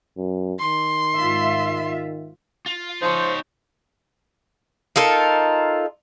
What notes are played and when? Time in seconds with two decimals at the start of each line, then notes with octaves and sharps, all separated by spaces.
0.17 F#2
0.59 D#3 C6
1.16 G#2 F4 E5
2.66 F4
3.02 F3 D#4 C5 C#5
4.96 D#4 F4 A4 A#4